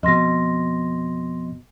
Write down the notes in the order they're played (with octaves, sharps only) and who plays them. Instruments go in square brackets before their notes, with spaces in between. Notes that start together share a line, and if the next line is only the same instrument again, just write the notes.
[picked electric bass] F2 B2 [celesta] D#5 C6 A#6